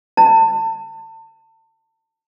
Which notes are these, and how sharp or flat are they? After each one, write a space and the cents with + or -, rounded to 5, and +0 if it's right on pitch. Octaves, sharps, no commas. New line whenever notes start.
A5 +35